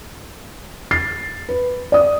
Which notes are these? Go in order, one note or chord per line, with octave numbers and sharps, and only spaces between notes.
A6 C7
B4
D5 D#6